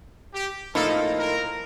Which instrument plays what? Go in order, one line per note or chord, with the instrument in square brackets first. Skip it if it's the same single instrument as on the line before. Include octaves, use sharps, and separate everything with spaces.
[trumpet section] G4
[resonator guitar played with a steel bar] A2 F3 A#3 D#4 [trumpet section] A4
[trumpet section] A#4